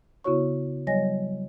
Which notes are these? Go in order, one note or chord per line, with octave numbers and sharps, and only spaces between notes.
C#3 B3 E4 F#4 C#5 C#6
F#3 G3 C#5 D#5 G#5 A#6